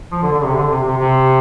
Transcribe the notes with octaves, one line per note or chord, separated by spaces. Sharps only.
F3
D3
D3
C3
D3
C3
C3
C3